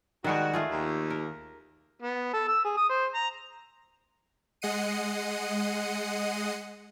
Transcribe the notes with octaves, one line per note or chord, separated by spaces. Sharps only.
D#3 G3 G#3 F#4
A3 F4 G#4
D#2
A#4
B3
A4
E6
G#4
D#6
C5
A#5
G#3 D#5 F#5 C7 C#7 D#7